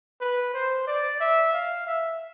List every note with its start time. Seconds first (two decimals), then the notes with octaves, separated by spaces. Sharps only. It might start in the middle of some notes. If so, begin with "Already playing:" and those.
0.21 B4
0.54 C5
0.87 D5
1.20 E5
1.53 F5
1.87 E5